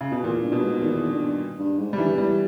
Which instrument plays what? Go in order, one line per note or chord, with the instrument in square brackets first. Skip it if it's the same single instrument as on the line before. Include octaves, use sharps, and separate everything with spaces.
[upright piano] C#3
B2
[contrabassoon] E2 [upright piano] A#2
[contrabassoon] G2
[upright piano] B2
[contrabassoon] G#2
[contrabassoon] E2 [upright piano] D#3
[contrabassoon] G2
G2
G#2
[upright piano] G3
[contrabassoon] G2 [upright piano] E3
[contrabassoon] E2
[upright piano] G3